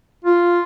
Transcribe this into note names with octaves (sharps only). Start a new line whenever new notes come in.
F4